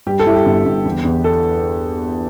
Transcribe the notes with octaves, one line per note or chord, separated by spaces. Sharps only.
G2 G4
A4
G2 E4
G4
G1
G1
E2
E2
A4